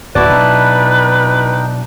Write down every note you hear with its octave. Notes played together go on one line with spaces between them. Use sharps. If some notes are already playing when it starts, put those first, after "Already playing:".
D1 G2 A#3 D4 E4 F#4 B4 B5
B2 F#3 D#4 G5